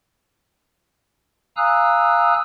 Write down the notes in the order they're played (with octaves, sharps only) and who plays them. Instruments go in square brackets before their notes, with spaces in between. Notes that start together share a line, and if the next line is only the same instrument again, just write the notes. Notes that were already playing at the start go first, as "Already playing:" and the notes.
[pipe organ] F5 G#5 A#5 D#6 E6 F#6